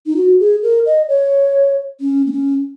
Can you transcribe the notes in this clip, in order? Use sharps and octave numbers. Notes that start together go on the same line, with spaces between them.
D#4
F#4
G#4
A#4
D#5
C#5
C#4
A#3
C#4